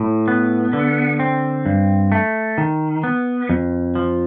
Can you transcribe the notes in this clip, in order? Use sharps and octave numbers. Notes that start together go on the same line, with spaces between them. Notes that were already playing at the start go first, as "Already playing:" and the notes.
Already playing: A2
B3
D3
C4
G2
A3
D#3
B3
F2
F3